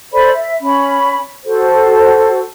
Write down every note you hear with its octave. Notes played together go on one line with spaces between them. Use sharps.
A4 C5 D5 B5
E5
C#4 B5
F#4 A4 C5